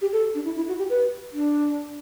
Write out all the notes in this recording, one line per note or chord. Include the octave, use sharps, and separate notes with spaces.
G4
A4
D4
E4
E4
F#4
G4
B4
D4